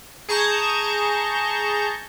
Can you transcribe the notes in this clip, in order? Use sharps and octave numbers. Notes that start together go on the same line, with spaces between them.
G#4 A5 A#5 C#6 G6